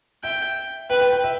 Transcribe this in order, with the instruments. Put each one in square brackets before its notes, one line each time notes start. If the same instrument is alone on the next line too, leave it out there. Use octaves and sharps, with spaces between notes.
[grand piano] E5 [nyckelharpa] G5
[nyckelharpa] B4 [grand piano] G5
[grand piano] G5
G5
E5